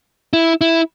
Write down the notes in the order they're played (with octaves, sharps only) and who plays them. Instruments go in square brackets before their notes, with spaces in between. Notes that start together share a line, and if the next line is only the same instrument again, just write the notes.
[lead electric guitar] E4
E4